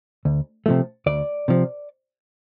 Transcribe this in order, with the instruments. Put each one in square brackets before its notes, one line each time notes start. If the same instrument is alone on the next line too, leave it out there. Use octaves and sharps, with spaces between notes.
[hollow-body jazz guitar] D2
C3 F3 A3
D2 D5
C3 F3